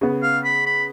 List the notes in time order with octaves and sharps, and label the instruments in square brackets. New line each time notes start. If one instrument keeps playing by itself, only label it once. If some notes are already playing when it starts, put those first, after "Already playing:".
[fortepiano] C#3 B3
[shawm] F5
B5
B5